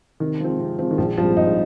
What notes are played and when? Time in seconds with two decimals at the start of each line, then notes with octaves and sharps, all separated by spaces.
0.20 C3 D#3
0.40 F3 G#3 C4
0.59 C3
0.78 F3 G#3 C4
0.91 D#3
0.98 A#1 F3
1.17 G#2 F3 G3 C4 F4
1.37 A#1 D#4